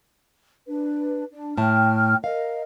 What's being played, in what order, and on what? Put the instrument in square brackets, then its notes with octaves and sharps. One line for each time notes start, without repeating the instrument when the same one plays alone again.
[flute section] D4 B4
D4
[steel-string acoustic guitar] A2 A5 [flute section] G5 F6
[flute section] A#4 D#5 [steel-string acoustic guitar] F5